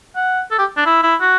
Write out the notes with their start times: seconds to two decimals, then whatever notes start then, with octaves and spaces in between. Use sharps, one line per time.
0.16 F#5
0.51 A4
0.59 G4
0.77 D4
0.86 E4
1.03 E4
1.21 F#4